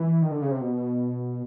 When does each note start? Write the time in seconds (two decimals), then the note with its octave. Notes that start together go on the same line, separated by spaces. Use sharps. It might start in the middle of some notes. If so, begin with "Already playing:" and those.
Already playing: E3
0.22 D#3
0.31 D3
0.42 C#3
0.51 C3
0.61 B2